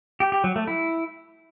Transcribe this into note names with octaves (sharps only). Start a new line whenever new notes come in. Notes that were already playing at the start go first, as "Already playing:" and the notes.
G4
G4
F#3
A3
E4